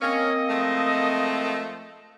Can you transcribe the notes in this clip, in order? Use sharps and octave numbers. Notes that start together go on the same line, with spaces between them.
A#3 C4 C#4 D#5
F3 G#3 A3